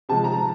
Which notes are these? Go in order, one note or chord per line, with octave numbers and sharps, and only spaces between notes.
C3 F3 G#3 A5
A#5